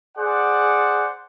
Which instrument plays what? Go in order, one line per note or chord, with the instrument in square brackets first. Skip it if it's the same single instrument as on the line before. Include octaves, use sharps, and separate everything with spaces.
[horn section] G#4 C5 D5 F#5